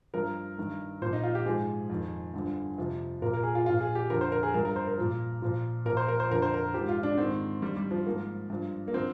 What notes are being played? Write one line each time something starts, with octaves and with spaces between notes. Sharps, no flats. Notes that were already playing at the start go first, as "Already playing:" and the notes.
G2 F3 A#4
G2 D#3
A#2 F3 C5
D#4
F4
G4
G#2 F3 G#4
F2 D#3
G2 D3 F3
F2 C3 F3
A#2 F3 A#4
A#4
G#4
F4
A#2 F3 F4
G#4
G4
F2 D3 F3 A#4
C5
A#4
G#4
G2 F3 A#4
A#4
C5
A#4
A#2 F3
A#2 F3
A#2 F3 A#4
C5
A#4
C5
F2 D3 F3 A#4
C5
A#4
G#2 F3 G4
F4
D4
G#2 D#3 C4
G2 D#3 G3
G3
F3
G#2 F3 A#3
G2 F3
A#3
D3 F3 C4